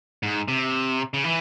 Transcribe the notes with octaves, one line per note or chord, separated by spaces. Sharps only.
G#2
C3
C#3
E3